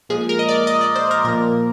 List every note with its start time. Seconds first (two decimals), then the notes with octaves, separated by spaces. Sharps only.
0.09 A#2 F3 G#3 G#4
0.29 A#4
0.39 D#5
0.49 D5
0.67 D#5
0.81 D5
0.96 C5
1.11 A#4
1.24 A#2 F3 A#3 A#4